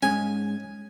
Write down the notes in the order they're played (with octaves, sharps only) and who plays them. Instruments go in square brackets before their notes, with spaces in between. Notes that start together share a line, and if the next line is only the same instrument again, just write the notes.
[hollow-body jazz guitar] G#2 G#3 C#4 [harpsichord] G#5